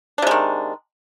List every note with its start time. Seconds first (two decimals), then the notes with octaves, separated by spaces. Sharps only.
0.18 D4
0.22 C3
0.27 G#3
0.31 D#3